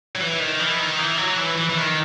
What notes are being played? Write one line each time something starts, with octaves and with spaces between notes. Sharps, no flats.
F#3
E3
D#3
E3
D#3
E3
F#3
E3
E3
E3
D#3